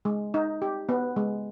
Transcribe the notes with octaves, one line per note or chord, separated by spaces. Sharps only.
G#3
D#4
G4
B3
G#3